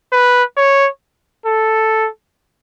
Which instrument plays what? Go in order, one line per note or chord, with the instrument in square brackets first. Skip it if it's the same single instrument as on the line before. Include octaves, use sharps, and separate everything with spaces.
[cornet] B4
C#5
A4